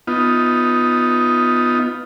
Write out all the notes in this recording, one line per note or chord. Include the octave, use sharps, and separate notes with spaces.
B3 D#4 F4